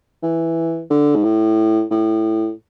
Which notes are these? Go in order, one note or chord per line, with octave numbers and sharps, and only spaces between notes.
E3
D3
G#2
A2
A2